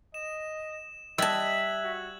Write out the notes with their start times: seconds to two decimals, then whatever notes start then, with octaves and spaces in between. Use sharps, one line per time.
0.14 D#5 E7
1.18 G3 D#5 E5 A5 F#6 G#6 F#7
1.84 F#4